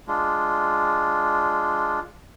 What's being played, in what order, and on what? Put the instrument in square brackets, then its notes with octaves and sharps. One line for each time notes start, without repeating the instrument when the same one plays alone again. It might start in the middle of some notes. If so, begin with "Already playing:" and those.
[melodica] G#3 D4 F4